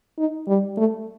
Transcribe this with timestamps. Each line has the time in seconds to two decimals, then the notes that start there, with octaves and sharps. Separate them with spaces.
0.18 D#4
0.48 G3
0.77 A3